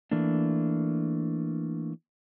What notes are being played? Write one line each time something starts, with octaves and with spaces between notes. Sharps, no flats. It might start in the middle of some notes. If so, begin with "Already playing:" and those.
E3 A3 A#3 D4